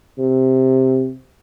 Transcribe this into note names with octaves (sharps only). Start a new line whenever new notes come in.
C3